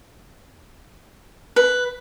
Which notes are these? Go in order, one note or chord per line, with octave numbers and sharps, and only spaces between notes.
B4